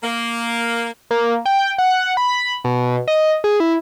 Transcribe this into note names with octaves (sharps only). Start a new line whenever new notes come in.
A#3
A#3
G5
F#5
B5
B2
D#5
G#4
E4